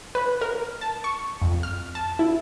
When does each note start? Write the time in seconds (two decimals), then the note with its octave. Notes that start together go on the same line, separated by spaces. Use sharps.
0.15 B4
0.41 A#4
0.81 A5
1.04 C#6
1.42 F2
1.63 F6
1.95 A5
2.19 E4